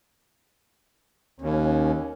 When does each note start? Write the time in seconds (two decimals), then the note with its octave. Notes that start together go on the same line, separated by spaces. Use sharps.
1.42 D#2 C#4